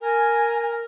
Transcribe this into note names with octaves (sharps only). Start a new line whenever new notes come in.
A#4 G#5